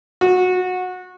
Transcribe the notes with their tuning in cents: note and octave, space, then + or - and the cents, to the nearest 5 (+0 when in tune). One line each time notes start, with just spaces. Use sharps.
F#4 -20